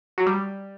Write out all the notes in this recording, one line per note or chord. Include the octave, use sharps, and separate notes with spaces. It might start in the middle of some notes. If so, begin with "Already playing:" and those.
F#3
G3